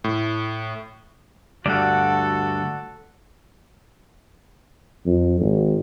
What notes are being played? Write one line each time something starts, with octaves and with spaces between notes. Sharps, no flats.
A2
D2 G2 F#4 A4 D5 F#5
F2
G#1